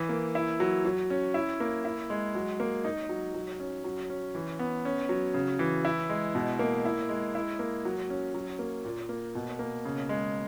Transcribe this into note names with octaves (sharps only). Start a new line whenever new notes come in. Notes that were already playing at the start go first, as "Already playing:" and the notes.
Already playing: E3
A#3
E4
F#3
F#3
C#4
E4
A#3
E4
G#3
F#3
A#3
D#4
F#3
F#3
C#4
F#3
C#4
E3
B3
C#4
F#3
C#3
E3
E4
G#3
B2
A#3
E4
G#3
E4
A#3
F#3
C#4
F#3
A#3
A#2
A#3
B2
A#3
C#3
G#3